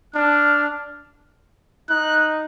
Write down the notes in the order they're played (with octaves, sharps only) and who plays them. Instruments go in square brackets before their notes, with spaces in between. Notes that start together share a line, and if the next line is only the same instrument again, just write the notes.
[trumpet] D4 [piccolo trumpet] F6
[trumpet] D#4 [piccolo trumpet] F#6